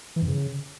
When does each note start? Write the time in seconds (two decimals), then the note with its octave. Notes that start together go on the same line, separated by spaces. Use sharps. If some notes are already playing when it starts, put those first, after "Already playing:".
0.16 E3
0.22 F#2
0.28 C#3